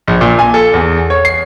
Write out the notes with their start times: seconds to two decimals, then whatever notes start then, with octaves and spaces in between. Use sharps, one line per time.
0.08 A#1
0.21 A#2
0.39 G#5
0.54 A4
0.73 E2
1.10 C#5
1.25 C7